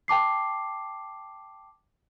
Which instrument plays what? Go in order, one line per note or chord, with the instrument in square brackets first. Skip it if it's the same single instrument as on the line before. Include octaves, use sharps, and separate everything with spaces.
[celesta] G5 A5 D6 C7